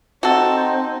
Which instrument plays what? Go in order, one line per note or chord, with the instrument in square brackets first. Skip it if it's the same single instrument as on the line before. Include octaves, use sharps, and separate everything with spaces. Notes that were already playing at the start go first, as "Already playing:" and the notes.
[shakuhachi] C4 [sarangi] D#4 [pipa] F#4 A4